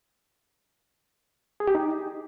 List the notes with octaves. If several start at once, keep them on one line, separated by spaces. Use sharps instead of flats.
G#4
G4
D#4